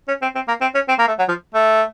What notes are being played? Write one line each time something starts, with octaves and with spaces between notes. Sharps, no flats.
C#4
C4
C4
A#3
C4
C#4
C4
A#3
A3
F#3
F3
A3